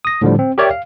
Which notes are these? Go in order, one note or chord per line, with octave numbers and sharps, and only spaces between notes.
D#6 A#6
A2 D3 F3 G3
C4
G4 A#4 C#5 D5 E5 G5
F5